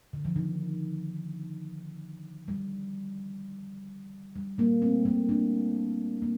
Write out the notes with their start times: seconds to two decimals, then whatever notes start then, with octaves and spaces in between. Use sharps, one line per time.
0.13 D3
0.25 F3
0.36 D#3
2.48 G3
4.36 G3
4.58 G3 A#3
4.82 A3 C4
5.05 G3 A#3
5.29 A#3 D4
6.22 A#3